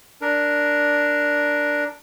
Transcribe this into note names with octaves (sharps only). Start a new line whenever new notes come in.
D4 A#4